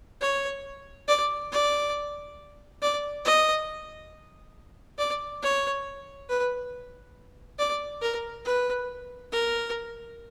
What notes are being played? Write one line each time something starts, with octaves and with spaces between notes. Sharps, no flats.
C#5
D5
D5
D5
D#5
D5
C#5
B4
D5
A#4
B4
A#4